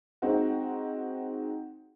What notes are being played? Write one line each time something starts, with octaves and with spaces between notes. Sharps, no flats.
G#3 C4 D#4 F#4